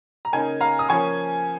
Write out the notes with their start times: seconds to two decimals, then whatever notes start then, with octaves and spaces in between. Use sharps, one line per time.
0.25 A#5
0.32 C#3 A#3 D#4 G#5
0.61 F5 A#5
0.79 D#6
0.89 F3 A#3 C#4 G#5 C#6